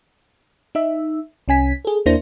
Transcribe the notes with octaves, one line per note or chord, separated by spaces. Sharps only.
D#4 E5
C2 C#4 G#5 B6
G#4 A4
D#2 A#3 D4 E4 C5 A#6